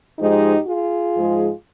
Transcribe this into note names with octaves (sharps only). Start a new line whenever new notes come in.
G#2 F3 G#3 D#4 G4
F4 G#4
G#2 F3 G#3